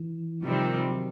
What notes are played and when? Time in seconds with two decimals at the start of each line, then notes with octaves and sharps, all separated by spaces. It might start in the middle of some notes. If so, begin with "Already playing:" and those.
Already playing: E3
0.43 C3 D#3 F3 G3 C4
0.89 F#3